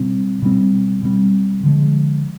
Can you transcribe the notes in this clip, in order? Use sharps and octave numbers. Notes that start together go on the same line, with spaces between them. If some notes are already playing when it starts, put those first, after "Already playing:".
Already playing: B2 G3 C4
B2 G3 C4
B2 G3 C4
D3 F3 G#3